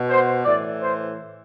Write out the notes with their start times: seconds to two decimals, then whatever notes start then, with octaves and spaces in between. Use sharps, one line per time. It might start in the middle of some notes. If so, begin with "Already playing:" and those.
Already playing: B2
0.09 C5
0.45 A2 E3 D5
0.82 C5